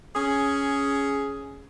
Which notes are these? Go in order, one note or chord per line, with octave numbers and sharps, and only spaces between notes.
C#4 G#4